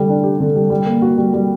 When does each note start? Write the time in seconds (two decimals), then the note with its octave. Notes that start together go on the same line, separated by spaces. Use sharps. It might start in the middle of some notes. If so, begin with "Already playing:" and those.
Already playing: D3 G3 A3
0.09 D4
0.24 G4
0.40 D3
0.56 G3
0.70 G3
0.86 A#3
1.02 F#4
1.17 G3
1.34 G3